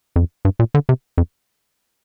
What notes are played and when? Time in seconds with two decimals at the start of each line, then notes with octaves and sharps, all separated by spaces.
0.16 F2
0.45 G2
0.59 A#2
0.74 D3
0.89 C3
1.18 F2